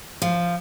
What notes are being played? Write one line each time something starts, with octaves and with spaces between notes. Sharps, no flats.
F3